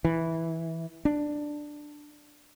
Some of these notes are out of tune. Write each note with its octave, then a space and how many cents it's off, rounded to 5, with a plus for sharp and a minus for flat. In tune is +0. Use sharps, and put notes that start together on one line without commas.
E3 -10
D4 +10